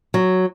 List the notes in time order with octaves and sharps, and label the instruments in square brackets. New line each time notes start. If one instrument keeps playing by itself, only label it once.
[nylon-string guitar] F#3